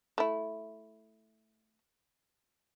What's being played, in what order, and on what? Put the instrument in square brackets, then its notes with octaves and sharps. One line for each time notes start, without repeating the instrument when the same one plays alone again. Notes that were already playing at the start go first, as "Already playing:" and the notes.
[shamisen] A3 E4